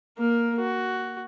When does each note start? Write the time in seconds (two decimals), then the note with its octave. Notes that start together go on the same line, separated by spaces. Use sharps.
0.18 A#3 A#4
0.59 F#4